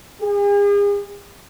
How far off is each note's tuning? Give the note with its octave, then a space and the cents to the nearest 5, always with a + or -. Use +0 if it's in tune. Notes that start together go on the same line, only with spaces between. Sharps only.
G#4 -40